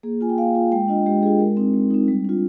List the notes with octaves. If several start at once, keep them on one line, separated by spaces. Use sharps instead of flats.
A#3 G#4
F4 G#5
G5
A#3 F5
F4
G#3 G5
D4 F4 D#5
G#3 G4
D4 F4 G#4
G#3 A#4
C4 D#4
G#3
C4 D#4
G3
D4 F4